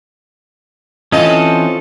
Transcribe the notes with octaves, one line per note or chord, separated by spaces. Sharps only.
E3 C4 C#4 F4 A4 D#5